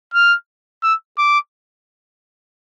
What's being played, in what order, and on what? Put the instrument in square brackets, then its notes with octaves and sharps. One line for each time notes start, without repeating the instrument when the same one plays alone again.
[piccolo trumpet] F6
E6
D6